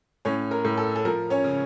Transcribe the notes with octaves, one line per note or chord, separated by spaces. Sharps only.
A2 C#4 C#5
A#4
A2
A4
A4
F3 A#4
C#4 C#5
C#3